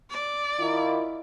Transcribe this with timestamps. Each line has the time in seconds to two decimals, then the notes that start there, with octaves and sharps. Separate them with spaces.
0.10 D5
0.59 D#3 E4 F4